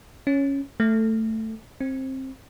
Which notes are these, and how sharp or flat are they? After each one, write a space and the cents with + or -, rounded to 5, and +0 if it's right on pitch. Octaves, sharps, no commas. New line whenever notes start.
C#4 +0
A3 +10
C4 +20